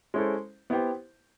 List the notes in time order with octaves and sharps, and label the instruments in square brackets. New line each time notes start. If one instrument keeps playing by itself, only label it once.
[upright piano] G#3 C#4 E4 A4 C5
B3 E4 G4 C5